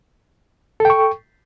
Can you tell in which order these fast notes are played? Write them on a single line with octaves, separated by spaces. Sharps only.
A4 G5 C#6